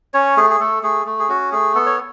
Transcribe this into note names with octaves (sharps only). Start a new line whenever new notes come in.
C#4 C#5
A3 G#4
G#4
A3 A4
A3 G#4
A3
G#4
C#4 F#4
A3 G#4
B3 A4
C#5